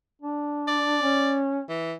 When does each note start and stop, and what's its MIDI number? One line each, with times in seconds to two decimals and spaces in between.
0.22 0.98 62
0.68 1.37 74
1.02 1.62 61
1.69 1.94 52